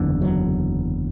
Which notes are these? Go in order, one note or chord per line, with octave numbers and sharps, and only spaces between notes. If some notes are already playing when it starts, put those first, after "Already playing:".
Already playing: F#1 E2 D3
F#3